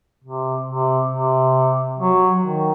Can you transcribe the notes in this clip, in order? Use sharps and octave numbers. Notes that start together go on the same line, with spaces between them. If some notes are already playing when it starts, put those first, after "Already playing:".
C3
C3
C3
F#3
D#3